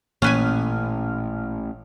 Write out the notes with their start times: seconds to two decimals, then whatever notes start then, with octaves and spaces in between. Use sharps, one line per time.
0.22 A1 A#2 C#4 B4 G#5 F6